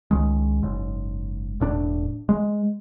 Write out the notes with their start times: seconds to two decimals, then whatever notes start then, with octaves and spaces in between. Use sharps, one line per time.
0.11 C#2 D#3 G#3
0.63 F#1 G#2
1.60 E1 A2 D4
2.29 G#3